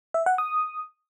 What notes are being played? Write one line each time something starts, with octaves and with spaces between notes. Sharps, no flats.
E5
F#5
D#6